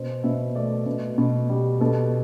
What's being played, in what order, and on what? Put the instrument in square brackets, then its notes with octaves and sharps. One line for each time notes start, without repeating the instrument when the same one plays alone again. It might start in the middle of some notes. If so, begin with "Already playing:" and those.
Already playing: [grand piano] B2 C5
B2 E5
A3 D5
B2
B2
G3
B2 A4